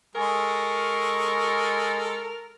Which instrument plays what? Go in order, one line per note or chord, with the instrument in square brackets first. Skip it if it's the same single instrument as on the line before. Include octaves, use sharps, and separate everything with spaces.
[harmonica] G#3 A4 [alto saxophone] A#4 [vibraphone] G#5 [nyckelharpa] C#6